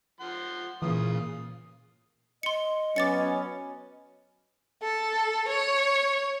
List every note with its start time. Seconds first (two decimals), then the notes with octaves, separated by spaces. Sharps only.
0.20 F3 F#5 C6
0.82 A#2 C#3 E3 F4 D#6
2.43 D#5 C6 C#7
2.96 F#3 B3 C#4 D6 A6 C#7
4.82 A4
5.48 C#5